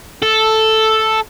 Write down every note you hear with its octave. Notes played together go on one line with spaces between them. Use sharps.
A4